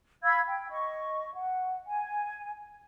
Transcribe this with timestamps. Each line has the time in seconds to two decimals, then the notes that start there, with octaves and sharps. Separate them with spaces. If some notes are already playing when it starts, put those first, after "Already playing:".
0.23 F5 B5 E6 G#6
0.45 G5
0.70 D#5 C#6
1.34 F#5
1.86 G#5